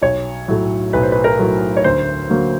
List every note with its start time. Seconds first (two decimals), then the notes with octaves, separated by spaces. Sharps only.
0.02 B1 C#5
0.48 A2 F#3 A3
0.93 B1 B4
1.03 C5
1.12 B4
1.24 A#4
1.39 A2 F#3 A3
1.77 C#5
1.84 D2 C5
2.29 D3 F#3 A#3